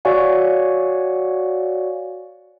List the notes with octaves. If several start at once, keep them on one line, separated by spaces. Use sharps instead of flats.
F#4 C#5 D5 F5 F#5 G#5